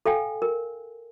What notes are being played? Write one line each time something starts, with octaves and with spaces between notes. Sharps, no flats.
A4 F5 G5 G#5
A#4